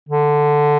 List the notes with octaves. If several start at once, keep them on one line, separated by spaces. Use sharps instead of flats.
D3